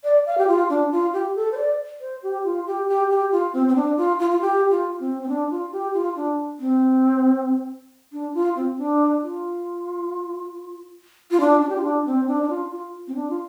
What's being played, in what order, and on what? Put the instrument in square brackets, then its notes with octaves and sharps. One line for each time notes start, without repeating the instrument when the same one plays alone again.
[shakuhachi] D5
F5
G4
F4
D4
F4
G4
A4
C5
D5
C5
G4
F4
G4
G4
G4
F4
C4
C4
D4
F4
F4
F4
G4
F4
C4
C4
D4
F4
G4
F4
D4
C4
D4
F4
C4
D4
F4
F4
D4
D4
G4
F4
D4
C4
D4
D4
F4
F4
C4
D4
F4